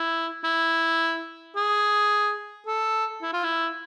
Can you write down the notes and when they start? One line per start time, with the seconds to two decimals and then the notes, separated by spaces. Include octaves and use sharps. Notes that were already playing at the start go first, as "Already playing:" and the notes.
Already playing: E4
0.44 E4
1.56 G#4
2.67 A4
3.22 E4
3.33 F4
3.44 E4